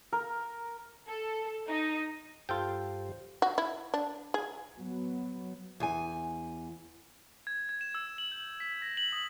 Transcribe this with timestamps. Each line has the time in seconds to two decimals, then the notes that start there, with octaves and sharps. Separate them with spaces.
0.13 A#4
1.07 A4
1.69 D#4
2.49 G2 F4 G4 A4 C5 G5
3.42 F#4
3.58 E4
3.94 D4
4.34 G#4
4.77 F#3 B3
5.80 E2 G#5
7.47 G#6
7.69 G#6
7.81 E7
7.95 E6
8.18 F#7
8.32 G6
8.60 B6
8.82 A#6
8.97 F#7
9.13 D#6